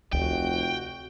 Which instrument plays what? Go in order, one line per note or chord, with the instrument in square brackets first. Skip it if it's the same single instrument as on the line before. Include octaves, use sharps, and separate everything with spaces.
[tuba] F1 [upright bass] D2 [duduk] F#4 [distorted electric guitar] G5